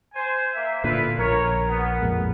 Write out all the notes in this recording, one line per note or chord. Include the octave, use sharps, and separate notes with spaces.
C5 G#5
A#3 E5
A#2 D3 E4 F4 B4
A#1 A#4 C#5
B3
F2 A#2 G#3